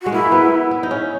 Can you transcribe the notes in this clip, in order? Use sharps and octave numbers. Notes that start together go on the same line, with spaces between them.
G#3 F#4
A#3 E4
B3
E4
D#4
C#4